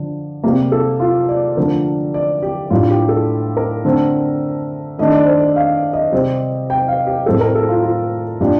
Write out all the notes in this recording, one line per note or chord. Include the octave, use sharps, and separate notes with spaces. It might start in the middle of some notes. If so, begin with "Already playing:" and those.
Already playing: D3 F3
C3 G3 A#3
A4
F4
D5
D3 F3 A3 D4 A#4
D5
G4
A2 G3 D4 F4
G4
A4
A#4
D3 A3 C4
D#3 A3 D4 D#5
D5
C5
D5
F5
D#5
C3 G3 C4
G5
F5
G4
A2 G3 C4 A4
A#4
A4
F4
F4
A#2 G3 D4 G4